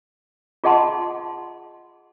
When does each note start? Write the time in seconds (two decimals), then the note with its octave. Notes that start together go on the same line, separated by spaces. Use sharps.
0.64 F4 G#4 D#5 F#5 A5 C6